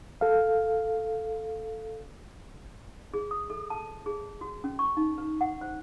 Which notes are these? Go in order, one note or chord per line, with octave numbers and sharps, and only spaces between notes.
A4 F5
G#4
D#6
A4
A5
G#4
F#4
C#4
C#6
D#4
B4
F#5
C5